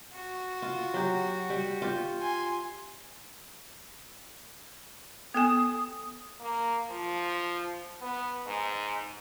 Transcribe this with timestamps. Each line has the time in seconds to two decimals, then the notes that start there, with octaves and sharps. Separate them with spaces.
0.13 F#4
0.62 F4
0.94 F#3 G4
1.50 G3
1.82 F4 G4
2.22 G#5 C6
5.34 B3 A4 G#5 D#6
6.41 A#3
6.90 F3
8.01 B3
8.46 G#2